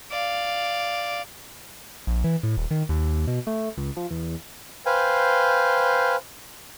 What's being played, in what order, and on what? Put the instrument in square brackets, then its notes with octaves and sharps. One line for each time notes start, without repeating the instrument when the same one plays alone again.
[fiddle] D5 F5
[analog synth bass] A#1
E3
A2
D#1
D#3
D#2
B2
A3
C#2
F3
E2
[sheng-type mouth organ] B4 C5 F5 G5 G#5